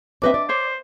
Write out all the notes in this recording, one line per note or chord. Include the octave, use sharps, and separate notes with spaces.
C4 D4 B4 C#5 D#5 E5 D6
D5
C5 C#5